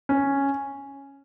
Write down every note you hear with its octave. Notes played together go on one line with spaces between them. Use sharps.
C#4